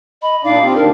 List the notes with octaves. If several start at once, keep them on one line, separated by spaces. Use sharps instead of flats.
D#5 B5
A#2 D4 D#4 D5 F5
C4 F4 G4
D2 D4 A#4